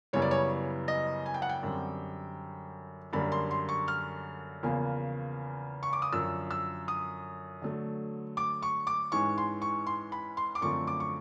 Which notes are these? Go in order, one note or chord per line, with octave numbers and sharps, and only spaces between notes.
F#2 C#3 E3 G3 B3 C#5
D5
C#5
D#5
G#5
G5
F#5
G5
F#2 D3 G3 C4
F#2 D3 G3 A#3 D4 B5
C6
C6
C#6
F6
E2 C#3 F3 A#3
C#6
D6
D#6
F#2 D3 F3 E6
E6
D#6
D3 F#3 A3
D6
C#6
D6
G#2 E3 G#3 C#4 C#6
C6
C#6
C6
B5
C6
D6
F#2 D3 F3 A3 C4 C#6
D6
C#6